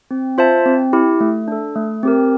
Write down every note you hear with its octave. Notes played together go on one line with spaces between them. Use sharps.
C4
F4 C5 E5 A5
C4
E4 G4
A3
D4 A4
A3
C4 G4 A#4